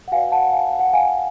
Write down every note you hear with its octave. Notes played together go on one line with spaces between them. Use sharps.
F#5
F#4 B4 D5 F5 G#5
F#5 A5
F5 G#5
F5
F#5
F5 G#5